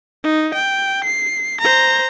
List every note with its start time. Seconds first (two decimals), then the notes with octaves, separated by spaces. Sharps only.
0.23 D#4
0.54 G5
1.04 C7
1.61 C5 A#5